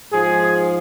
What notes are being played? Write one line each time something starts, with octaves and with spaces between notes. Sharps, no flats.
G#2 F3 G#4